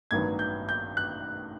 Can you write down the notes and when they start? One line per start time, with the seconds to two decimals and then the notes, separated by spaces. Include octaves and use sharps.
0.11 A1 G2 D#3 F#3 B3 G#6
0.39 G6
0.69 G6
0.97 F#6